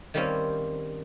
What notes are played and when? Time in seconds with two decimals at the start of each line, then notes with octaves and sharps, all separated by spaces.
0.14 D#3 G3 A#3 C4 C#4 C5